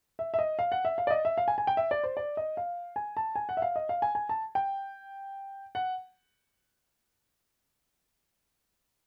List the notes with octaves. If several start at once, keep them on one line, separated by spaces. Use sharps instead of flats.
E5
E5
D#5
F5
F#5
E5
F5
D5
D#5
E5
F5
G#5
G#5
G5
E5
D5
C5
D5
D#5
F5
G#5
A5
G#5
F#5
E5
F5
D#5
F5
G#5
G#5
A5
G5
F#5